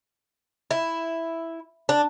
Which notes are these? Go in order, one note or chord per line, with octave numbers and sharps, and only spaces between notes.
E4
D4